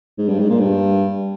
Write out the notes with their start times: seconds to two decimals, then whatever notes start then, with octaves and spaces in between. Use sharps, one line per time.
0.18 G#2
0.28 G2
0.39 G#2
0.50 A#2
0.60 G2